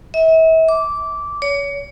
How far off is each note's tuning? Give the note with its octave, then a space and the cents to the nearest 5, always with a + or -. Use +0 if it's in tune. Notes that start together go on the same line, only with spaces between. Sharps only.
E5 -40
D6 -15
C#5 +30